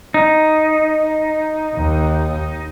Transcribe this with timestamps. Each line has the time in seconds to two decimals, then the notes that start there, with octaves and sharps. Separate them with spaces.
0.14 D#4
1.75 D#2